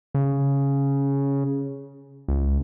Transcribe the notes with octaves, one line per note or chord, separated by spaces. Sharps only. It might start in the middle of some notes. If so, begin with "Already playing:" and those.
C#3
C#2